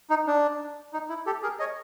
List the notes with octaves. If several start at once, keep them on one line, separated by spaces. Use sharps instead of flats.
D#4
D4
D#4
E4
G4 A4
G#4 A#4
C#5 D#5